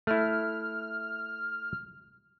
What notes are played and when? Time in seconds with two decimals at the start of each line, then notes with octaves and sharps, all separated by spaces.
0.07 A3 E4 F6